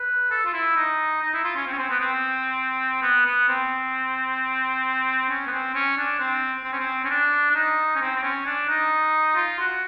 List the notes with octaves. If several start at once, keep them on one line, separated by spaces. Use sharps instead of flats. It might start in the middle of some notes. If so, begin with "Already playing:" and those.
Already playing: B4
A4
F4
E4
D#4
D#4
E4
F4
C#4
C4
C#4
C4
B3
C4
B3
B3
C4
C#4
B3
C4
C#4
D4
C4
C4
C#4
C4
C#4
D4
D4
D#4
C#4
C4
C4
C#4
D4
D#4
F4
F#4